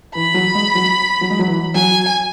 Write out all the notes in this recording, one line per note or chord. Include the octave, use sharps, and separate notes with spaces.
E3 B5
F#3
G#3
F#3
F#3
G#3
F#3
E3
F#3 G#5